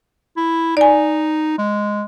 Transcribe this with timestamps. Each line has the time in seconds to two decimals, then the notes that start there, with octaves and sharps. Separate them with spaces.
0.37 E4
0.77 D#4 D5 G#5
1.58 G#3